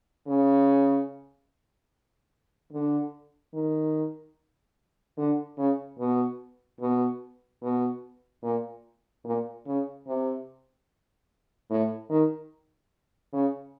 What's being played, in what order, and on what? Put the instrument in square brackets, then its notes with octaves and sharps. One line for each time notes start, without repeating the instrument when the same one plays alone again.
[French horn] C#3
D3
D#3
D3
C#3
B2
B2
B2
A#2
A#2
C#3
C3
A2
D#3
C#3